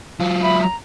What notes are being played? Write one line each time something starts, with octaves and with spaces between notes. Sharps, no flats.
F#3 F4
E5 B5
A#5